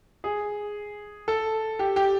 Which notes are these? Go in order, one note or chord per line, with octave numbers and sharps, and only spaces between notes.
G#4
A4
G4
G4